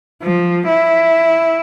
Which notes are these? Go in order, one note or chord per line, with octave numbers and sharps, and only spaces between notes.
F3
E4